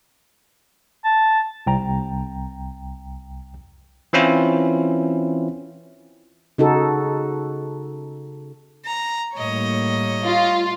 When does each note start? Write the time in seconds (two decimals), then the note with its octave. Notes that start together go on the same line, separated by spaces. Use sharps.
1.05 A5
1.67 C2 G5 A#5
4.13 E3 C4 C#4 E4 F4
6.58 C#3 D#4 F#4 A4
8.85 A#5
9.34 A2 G3 A#3 C#5 D#5
10.26 F4